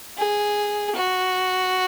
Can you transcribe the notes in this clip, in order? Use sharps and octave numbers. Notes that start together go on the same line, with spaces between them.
G#4
F#4